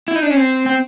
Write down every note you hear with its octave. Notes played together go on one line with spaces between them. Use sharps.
E4
D#4
D4
C#4
C4
C4